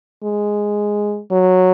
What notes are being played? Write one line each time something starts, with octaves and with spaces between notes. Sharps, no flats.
G#3
F#3